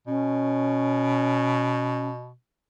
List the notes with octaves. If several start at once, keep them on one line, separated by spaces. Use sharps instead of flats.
B2 C#4